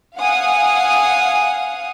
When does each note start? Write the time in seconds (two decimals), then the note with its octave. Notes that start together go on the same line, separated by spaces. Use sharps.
0.17 F5 F#5 G#5 D#6